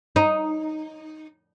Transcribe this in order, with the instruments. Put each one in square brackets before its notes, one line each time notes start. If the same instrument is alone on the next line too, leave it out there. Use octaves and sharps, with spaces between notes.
[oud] D#4